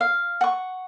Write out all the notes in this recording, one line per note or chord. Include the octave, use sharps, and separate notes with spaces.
F5
F#5 C#6